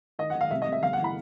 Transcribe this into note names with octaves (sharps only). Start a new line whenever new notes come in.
D#3 D#5
D#3 F#5
F5
C2 E5
D#5
C2
E5
G1 F5
F#5
E3
B5